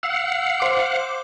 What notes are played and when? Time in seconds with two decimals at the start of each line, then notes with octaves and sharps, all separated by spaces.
0.03 F5 F#5 E6
0.60 C5 D6